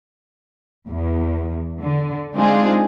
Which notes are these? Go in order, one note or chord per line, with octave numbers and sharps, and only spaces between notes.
E2
D3
G#3 C4 D4 D#4 F4 G#4